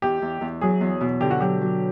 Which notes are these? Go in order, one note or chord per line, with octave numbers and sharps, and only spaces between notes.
E2 G4
E2
E2
F#3 G#4
E2
B2
D3 G4
F#4
F#3 G4
F#3